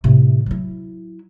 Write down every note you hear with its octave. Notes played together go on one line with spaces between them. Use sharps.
A2 C3
F#3 E4